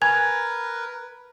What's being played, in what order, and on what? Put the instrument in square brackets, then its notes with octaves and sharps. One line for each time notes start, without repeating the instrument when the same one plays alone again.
[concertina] A#4 B4 [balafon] G#5 [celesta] G#6